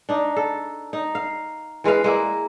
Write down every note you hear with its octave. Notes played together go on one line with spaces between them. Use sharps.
D4 D#4
A4
D#4
F5
E3 G#3 B4 F5
G#3 A#3 E4